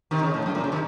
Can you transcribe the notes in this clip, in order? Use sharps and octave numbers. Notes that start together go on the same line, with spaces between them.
C3 D#3
C#3
A2
F#2
A#2
C#3
C3 D#3